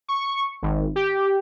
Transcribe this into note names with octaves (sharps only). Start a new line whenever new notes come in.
C#6
G#1
G4